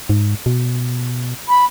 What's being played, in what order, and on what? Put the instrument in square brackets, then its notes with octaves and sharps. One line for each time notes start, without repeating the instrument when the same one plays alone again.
[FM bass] G#2
B2
[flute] B5